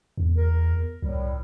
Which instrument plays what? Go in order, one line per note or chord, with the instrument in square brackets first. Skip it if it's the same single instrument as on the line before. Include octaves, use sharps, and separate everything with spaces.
[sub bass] E2
[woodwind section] A#4
[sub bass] C2 [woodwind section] A2 F#3 G3